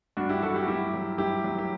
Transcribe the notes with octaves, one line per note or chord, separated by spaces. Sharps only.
G2 D4 F#4
E4 G4
F#3 F#4 A4
E4 G4
G2 E4 G4
F#3
G2 E4 G4
F#3
G4